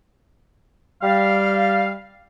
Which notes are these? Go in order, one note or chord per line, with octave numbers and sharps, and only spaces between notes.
G3 F5